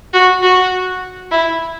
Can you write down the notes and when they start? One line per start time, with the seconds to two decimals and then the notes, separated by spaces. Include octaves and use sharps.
0.13 F#4
0.43 F#4
1.31 E4